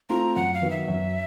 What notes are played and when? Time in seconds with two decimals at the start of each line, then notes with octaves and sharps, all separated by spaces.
0.09 A3 C4 F4 A#5
0.36 F#2 F#5
0.54 F5
0.62 D#3 F#3 B3
0.71 E5
0.88 F#2